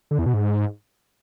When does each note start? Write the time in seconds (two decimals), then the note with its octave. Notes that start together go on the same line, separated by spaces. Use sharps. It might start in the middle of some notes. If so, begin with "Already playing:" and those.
0.11 D3
0.18 E2
0.26 B2
0.34 G#2